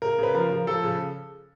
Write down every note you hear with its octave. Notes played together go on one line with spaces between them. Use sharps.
C#3 A#4
C#3 B4
F3 A#4
F3
F3 A4
C#3